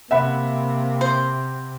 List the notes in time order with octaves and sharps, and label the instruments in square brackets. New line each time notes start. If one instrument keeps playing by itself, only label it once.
[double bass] C3 [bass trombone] A#3 [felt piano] E5 F#5 B5
[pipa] C5